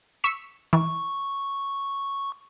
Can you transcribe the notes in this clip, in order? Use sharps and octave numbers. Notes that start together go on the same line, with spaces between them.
C#6 E6 B6
E3 C#6